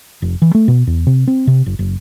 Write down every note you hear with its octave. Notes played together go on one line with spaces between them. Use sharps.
F1
E3
A3
B2
E2
C3
C4
C3
F#1
F#1